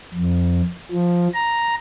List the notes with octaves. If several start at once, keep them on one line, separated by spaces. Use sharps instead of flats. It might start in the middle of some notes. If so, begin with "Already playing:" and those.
F2
F3
A#5